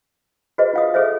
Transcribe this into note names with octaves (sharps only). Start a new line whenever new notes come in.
F#4 G#4 B4 C5 D#5
F4 F5 D#6
G#4 A4 C5 C#5 E5